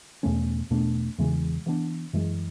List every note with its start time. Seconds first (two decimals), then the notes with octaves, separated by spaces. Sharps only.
0.23 E2 B2 A3 C#4
0.70 E2 B2 A3 D4
1.18 E2 C#3 E3 G#3
1.66 C#3 E3 B3 D4
2.13 F#2 E3 G#3